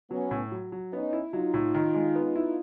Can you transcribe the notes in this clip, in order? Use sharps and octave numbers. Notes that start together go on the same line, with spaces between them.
F#3 B3 C#4
A2
F#3
F#3
B3 C#4 D#4
E4
F#3 D#4 F4
A2
D#3
G#3
B3
E4